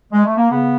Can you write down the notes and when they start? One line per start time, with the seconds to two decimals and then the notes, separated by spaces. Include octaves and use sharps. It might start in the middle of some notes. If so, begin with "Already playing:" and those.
0.12 G#3
0.25 A3
0.37 A#3
0.50 C#3 B3